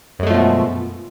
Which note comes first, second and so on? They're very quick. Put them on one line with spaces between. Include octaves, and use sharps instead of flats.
F#2 G#3 A3 F3 B2